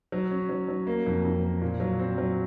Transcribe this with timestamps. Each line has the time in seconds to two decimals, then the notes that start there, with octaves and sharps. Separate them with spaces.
0.12 F#3
0.31 C#4
0.49 F#3
0.68 F#3
0.87 A#3
1.06 F2
1.25 F2
1.43 A#3
1.61 A#2
1.80 F#3
1.99 C4
2.18 F#3